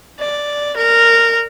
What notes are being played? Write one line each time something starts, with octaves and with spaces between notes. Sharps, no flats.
D5
A#4